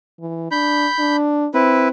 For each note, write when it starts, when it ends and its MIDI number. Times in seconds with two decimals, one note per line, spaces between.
0.20 0.51 52
0.51 0.87 62
0.51 1.16 83
0.51 1.16 91
0.99 1.47 62
1.54 1.89 60
1.54 1.88 64
1.54 1.88 71